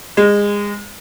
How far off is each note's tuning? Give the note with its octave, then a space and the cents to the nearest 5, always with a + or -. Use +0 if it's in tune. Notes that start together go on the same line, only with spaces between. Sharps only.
G#3 -25